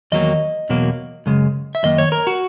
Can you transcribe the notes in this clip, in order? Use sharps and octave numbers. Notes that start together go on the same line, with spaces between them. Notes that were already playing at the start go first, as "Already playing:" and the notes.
E2 D#3 F#3 A#3 D#5
E2 B2 F#3 A#3
F#2 C#3 G#3
E5
F#2 D#3 A#3 D#5
C#5
A#4
F#4